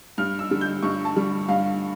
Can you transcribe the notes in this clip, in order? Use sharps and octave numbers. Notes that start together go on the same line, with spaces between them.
G2 F6
E6
D3 G3
G6
G2 C#6
A5
D3 G3
G2 F5